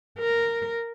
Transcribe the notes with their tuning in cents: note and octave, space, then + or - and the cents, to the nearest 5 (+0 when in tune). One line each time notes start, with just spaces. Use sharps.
A#4 -5